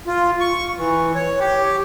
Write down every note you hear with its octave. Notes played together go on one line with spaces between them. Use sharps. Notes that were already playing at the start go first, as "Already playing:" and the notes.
F4
C#6
E3
C#5
G4